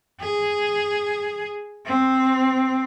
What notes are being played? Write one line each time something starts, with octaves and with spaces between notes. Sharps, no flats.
G#4
C4